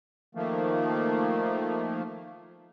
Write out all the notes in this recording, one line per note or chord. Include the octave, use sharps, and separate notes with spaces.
D#3 F3 A3 A#3